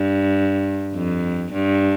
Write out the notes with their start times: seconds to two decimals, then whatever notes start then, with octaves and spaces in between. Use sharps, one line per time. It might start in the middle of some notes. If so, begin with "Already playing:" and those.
Already playing: G2
0.95 F2
1.52 G2